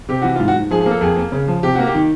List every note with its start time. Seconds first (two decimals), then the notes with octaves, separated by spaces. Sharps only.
0.09 C3 G4
0.22 E3 F#4
0.36 G#2 F4
0.48 F#4
0.56 G#2
0.71 F3 G#4
0.81 G#4
0.86 A#3 A4
1.01 F2 G#4
1.17 A#3
1.32 C#3
1.48 F3
1.63 C3 G4
1.75 A#3 F#4
1.87 G4
1.95 D#3